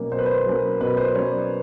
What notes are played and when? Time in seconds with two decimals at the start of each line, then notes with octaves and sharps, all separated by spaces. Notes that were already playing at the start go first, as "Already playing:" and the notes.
Already playing: B2 F#3 A#3 C#4
0.12 B2 C5
0.18 B4
0.26 C5
0.46 F#3 A#3 C#4
0.80 B2 B4
0.97 C5
1.15 F#3 A#3 C#4 C#5
1.31 D5